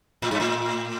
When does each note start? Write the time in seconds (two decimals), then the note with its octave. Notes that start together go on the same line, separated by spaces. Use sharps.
0.22 A2
0.31 G2
0.40 A2